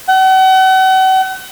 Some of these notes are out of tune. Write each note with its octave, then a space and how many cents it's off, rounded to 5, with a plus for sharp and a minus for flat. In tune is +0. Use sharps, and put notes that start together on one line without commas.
F#5 +40